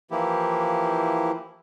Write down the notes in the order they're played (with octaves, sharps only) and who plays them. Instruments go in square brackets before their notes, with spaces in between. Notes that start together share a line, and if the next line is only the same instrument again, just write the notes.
[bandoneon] E3 F3 A#3 E4 G4